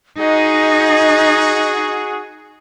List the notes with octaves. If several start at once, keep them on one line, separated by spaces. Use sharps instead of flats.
D#4 F#4 G#4 D#5